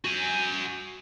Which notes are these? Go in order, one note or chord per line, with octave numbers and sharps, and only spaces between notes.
F#4 G#5